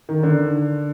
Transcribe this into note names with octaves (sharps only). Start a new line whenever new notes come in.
D#3
D3